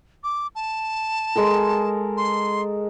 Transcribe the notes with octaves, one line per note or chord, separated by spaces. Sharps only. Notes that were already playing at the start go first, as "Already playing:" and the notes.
D6
A5
G#3 A4 A#4
C6